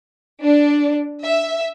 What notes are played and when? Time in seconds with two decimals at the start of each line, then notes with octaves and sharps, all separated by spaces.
0.42 D4
1.23 E5